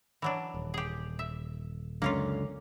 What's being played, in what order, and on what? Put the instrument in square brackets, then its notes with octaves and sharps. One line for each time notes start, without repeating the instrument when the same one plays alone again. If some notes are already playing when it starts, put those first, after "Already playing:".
[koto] E3 F#3 D4
[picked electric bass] D#1
[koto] G4 G#4
E5
[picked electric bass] C#2 F#2 D3 [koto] A#3 C#4 F4